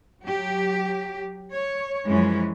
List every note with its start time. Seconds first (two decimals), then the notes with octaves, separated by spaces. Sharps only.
0.21 F#3 G4
1.52 C#5
2.06 F#2 E3 F3 G#3 C#4